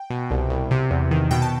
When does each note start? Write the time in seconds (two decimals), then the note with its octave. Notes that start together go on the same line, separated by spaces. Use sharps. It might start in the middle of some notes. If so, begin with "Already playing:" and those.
Already playing: G5
0.10 B2
0.31 C2
0.50 C2
0.71 C3
0.91 E2
1.11 D#3
1.31 B2 G5
1.42 A5